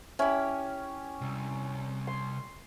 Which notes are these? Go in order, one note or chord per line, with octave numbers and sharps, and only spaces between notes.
C#4 E4 G4
C2
C6